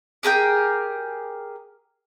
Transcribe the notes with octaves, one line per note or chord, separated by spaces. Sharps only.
G4 G#4 A#4 G5